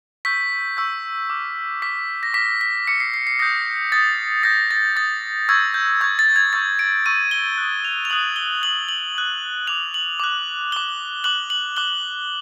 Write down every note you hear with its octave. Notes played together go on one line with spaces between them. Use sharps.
C#6 E6 G6 B6
C#6 E6 G6
D6 F6
D6 F6 B6
A#6
D6 F6 B6
B6
D6 F6 C#7
C7
C7
C7
D#6 G6 A#6
D#6 G6 A6
D#6 G6 A#6
A6
D#6 G6 A6
C#6 E6 G6 G#6
G6
C#6 E6 G6 G#6
A6
G#6
C#6 E6 G6 A6
D7
C#6 E6 G6 D#7
G7
D#6 F#6
F7
F7
D#6 F#6 F#7
G7
D#6 F#6 F#7
F#7
D#6 F#6
D6 F#6 F7
F#7
D6 F#6
D6 F#6 G7
D6 F#6 F#7
F#7
D6 F#6 G7